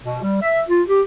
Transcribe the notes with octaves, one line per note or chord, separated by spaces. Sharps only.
B2
G3
E5
F4
G4